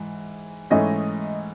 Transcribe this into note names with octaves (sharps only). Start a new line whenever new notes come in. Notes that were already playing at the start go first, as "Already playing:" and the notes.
Already playing: G#2 E3
G#2 E3 A3 C#4 D#5